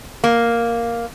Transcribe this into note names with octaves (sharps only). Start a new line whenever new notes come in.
A#3